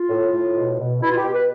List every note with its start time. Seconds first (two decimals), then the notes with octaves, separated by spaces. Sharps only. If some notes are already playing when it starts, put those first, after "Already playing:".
Already playing: F4
0.09 A2
0.33 A2
0.56 B2
0.79 B2
1.02 B2 E4
1.10 F4
1.17 G4
1.25 B2
1.33 B4